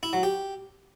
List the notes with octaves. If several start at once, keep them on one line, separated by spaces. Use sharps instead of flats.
E4
F#3
G4